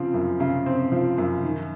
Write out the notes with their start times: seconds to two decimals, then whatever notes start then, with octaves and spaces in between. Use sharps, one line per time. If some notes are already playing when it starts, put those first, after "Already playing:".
Already playing: C#3 F3 C4
0.14 F#2
0.40 C#3
0.66 C4
0.92 F3
1.18 F#2
1.44 D#3